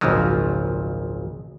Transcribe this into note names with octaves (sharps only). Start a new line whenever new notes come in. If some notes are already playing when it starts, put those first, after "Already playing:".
G#1 C#2 A#2 C#3 F3 F#3